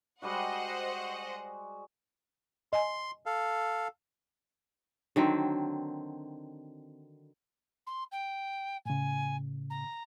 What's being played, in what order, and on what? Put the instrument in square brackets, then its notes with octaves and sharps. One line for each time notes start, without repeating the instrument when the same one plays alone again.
[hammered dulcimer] G3 G#3 F#4 [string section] C5 D#5 F#5
[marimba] D#5 G#5 [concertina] C6
[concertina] A4 F5
[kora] D3 D#3 F#3 C4
[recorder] C6
G5
[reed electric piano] A2 C#3 [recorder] G#5
[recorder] A#5